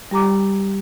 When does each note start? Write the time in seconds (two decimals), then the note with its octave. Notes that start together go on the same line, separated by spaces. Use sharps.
0.11 G3 G4 A#5 D6